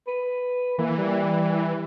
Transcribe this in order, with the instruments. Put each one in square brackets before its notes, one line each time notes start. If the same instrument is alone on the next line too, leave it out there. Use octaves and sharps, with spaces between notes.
[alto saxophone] B4
[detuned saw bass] E3 [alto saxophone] A#3
[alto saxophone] G3